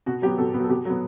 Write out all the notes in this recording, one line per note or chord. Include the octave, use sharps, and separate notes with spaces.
B2 F#4
F#3 B3 G4
B2 A4
F#3 B3
A4
B2 G4
F#3 B3